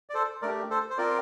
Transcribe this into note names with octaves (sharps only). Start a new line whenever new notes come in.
D5
A4 C5
A3 D4 G4 A#4 D5
A4 C5
C5
C4 F4 A#4 D5